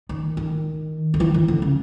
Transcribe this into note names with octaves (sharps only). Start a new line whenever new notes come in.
D#3
D#3
D#3
E3
D#3
D3
C#3